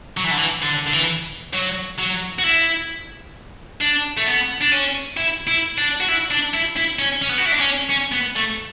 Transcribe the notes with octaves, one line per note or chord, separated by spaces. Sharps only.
F#3
E3
D3
E3
D3
D3
E3
F#3
F#3
F#4
E4
D4
A3
B3
D4
C#4
E4
E4
D4
F#4
E4
D4
E4
E4
C#4
C#4
B3
F#4
E4
D4
C#4
C#4
B3
A3